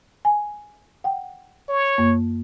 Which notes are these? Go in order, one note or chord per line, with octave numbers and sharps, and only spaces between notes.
G#5
F#5 G5
C#5
F#2 A#3